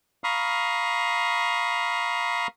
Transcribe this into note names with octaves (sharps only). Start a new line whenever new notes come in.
F5 A#5 B5 C#6 D#6 F6